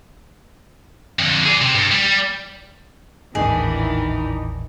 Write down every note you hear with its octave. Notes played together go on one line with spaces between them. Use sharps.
F2 D3
G#4 D5
C3 C4
G2
G3
G#1 D#2 A2 D#3 E3 D4 D#4 G#4